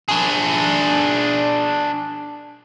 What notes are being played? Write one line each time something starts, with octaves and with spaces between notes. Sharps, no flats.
D4 G#4